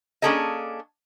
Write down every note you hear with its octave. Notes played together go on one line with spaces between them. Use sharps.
A#3 C#4 D4 G#4 A4 D#5